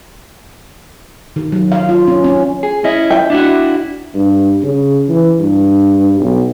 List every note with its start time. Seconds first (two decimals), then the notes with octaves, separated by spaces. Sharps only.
1.36 D#3
1.52 F#3
1.72 F5
1.89 F4
2.08 C#4
2.24 C#4
2.63 G#4
2.84 C#4 E4 D#5
3.10 E5 G5
3.30 D4 E4 F#4
4.15 G2
4.63 C#3
5.09 E3
5.40 G2
6.20 B1